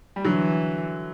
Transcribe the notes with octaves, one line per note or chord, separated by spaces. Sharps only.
G3
D3 E3 F#3